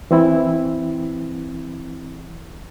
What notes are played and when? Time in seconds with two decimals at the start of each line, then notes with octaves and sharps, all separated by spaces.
0.11 E3 C4 E4